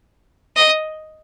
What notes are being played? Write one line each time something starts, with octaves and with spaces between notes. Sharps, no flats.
D#5